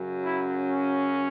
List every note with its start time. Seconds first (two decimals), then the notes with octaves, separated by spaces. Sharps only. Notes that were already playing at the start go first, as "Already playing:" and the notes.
Already playing: F#2 C#3 F#3
0.25 E4
0.72 C#4